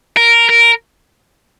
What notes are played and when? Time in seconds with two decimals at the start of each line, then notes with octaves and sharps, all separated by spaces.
0.17 A#4
0.49 A#4